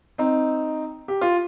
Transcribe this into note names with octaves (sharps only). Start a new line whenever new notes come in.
C4 D#4
G4
F4